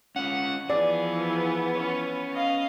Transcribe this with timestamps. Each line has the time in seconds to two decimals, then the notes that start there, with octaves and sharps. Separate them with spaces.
0.16 C#4 F4 F#5
0.70 E3 F3 B3 G#4 D5
1.76 C#4 C#5
2.33 D#5 F5